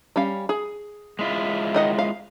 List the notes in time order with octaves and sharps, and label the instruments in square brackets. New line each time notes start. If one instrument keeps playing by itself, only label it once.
[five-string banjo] G3 C#4 F5
G#4
[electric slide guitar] G#3 E4 F4
[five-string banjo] D#3 D#5 F#5
F5